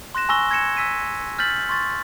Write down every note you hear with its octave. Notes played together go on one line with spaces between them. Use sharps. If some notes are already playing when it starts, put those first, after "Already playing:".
C6 F#6 A#6 E7
G#5 A#5 C#6 E6 A#6 G7
G#6 A#6 C#7 E7
E6 B6 D#7
F6 G6 A6 B6 F#7
C6 C#6 A6